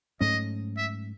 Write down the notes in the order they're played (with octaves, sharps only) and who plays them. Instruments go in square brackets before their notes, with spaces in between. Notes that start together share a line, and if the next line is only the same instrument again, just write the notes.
[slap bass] G#2 F#3 A3 C#4 [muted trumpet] D#5
[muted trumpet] E5